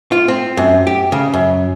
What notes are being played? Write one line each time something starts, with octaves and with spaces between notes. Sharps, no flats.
F4
C4
F#2
G4
C#3
F#2